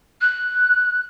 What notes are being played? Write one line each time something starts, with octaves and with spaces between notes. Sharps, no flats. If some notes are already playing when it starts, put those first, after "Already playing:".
F#6